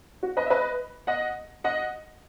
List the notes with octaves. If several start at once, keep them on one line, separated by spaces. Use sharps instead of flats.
F#4
B4 D#5
E5
B4 D#5
D#5 F#5
D#5 F#5